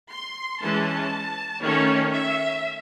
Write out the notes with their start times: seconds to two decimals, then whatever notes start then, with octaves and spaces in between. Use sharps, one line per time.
0.11 C6
0.62 E3 G#3 C#4 A5
1.62 D#3 A3 C#4 C#5
2.11 E5